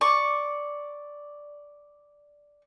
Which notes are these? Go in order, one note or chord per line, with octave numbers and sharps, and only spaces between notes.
D5 C#6